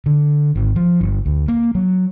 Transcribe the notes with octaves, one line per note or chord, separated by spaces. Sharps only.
D3
G#1
F3
G1
D2
A#3
F#3